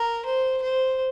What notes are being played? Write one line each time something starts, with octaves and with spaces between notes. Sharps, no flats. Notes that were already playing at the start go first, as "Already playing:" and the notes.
Already playing: A#4
C5
C5